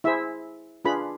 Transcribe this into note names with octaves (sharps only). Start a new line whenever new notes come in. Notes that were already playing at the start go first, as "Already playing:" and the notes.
E4 G#4 C5 E5
D4 F4 G#4 B4 B5